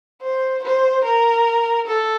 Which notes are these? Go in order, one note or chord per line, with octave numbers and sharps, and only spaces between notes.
C5
C5
A#4
A4